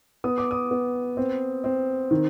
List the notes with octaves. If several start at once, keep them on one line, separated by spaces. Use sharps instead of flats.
B3 D#6
D6
D#6
B3
C4
C4
D#3